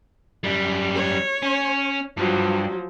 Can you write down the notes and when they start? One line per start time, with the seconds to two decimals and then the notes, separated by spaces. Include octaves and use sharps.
0.44 F#2 G3
0.95 C#5
1.43 C#4
2.17 G2 F3 F#3